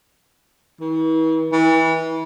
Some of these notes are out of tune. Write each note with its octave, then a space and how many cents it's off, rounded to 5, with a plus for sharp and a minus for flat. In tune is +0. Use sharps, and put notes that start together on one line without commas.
E3 -40
E3 -25